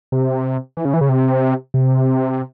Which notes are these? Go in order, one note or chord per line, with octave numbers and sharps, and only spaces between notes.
C3
E3
C#3
E3
C#3
C3
C3